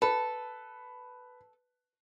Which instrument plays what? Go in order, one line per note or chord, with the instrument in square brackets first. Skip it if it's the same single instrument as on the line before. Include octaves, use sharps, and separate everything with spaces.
[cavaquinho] A4 [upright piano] B4